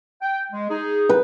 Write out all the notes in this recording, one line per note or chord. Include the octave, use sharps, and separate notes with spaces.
G5
G#3
D#4 G#4
B4